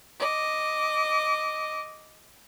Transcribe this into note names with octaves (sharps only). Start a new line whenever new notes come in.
D#5 D6